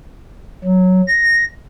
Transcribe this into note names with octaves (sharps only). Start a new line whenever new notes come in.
F#3
A#6